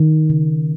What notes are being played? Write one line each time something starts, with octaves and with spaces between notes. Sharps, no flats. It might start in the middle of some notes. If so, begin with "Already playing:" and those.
Already playing: D#3
C#3